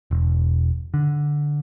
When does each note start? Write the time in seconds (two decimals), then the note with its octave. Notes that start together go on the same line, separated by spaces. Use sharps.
0.11 E1
0.94 D3